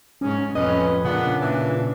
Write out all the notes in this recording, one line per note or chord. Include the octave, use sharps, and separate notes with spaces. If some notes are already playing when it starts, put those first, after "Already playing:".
G#2 C#4
F2 A2 C#4 B4 D#5
A#2 C#3 B3 D4
E3